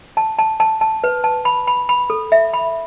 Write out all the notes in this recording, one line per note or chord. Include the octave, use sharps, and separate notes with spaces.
A5
A5
A5
A5
B4
A5
B5
B5
B5
A4
E5
B5